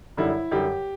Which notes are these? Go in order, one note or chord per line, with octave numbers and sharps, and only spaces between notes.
F#2 D3 G3 E4
F#2 D3 G3 G4